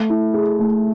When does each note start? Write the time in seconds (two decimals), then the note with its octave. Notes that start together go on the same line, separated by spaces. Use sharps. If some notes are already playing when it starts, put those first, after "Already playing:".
Already playing: A3
0.09 E4
0.34 G#4
0.59 A3